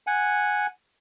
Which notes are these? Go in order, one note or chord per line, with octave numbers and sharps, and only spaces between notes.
F#5 G#5